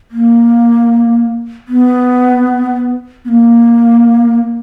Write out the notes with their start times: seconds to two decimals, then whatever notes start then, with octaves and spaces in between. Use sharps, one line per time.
0.11 A#3
1.68 B3
3.25 B3
3.28 A#3